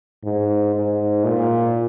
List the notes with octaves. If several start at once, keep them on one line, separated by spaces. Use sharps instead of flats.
G#2
G#2
A#2